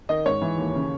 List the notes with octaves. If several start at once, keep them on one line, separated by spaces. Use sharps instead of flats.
D#3 D#5
G#2 C#5
E3
D#2
C#3